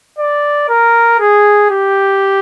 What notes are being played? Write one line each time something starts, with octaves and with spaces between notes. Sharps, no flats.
D5
A#4
G#4
G4